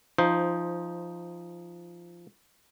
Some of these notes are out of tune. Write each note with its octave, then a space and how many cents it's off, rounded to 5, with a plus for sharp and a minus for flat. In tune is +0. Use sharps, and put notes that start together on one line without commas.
F3 -15 D#4 +0 C5 +0